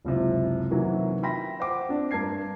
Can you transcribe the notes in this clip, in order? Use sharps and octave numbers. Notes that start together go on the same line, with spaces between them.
F#1 C#2 C3
C3 D#3 E3 F#3 A#3 C#4
E5 G5 B5 C6 A#6
C5 F#5 G5 D6
C4 D4
G2 A#4 A5 G#6 C7